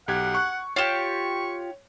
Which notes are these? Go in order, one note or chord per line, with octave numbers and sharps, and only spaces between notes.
B1 G4 F#5 G#6
C#6 F#6
F4 G4 C#5 C#6 E7